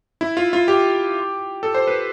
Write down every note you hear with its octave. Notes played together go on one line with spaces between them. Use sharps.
E4
F4
F4
G4
A4
C5
B4